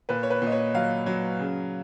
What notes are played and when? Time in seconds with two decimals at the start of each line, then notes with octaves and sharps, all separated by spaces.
0.09 A#2 B4
0.23 C#5
0.30 B4
0.42 A#2 D#5
0.52 C#5
0.74 F#3 F5
1.06 F#3
1.39 C#3